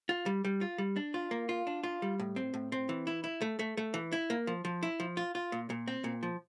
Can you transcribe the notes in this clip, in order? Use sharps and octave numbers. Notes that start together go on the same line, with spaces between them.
F4
G3
G3
F4
G3
D4
F4
A#3
F4
D4
F4
G3
A2
C4
A2
C4
E3
E4
E4
A3
A3
A3
E3
E4
A#3
F3
F3
E4
F3
F4
F4
A#2
A#2
C4
A#2
F3